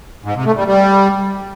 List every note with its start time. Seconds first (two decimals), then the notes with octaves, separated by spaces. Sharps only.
0.25 G#2
0.35 C3
0.45 A3
0.56 G3
0.66 G3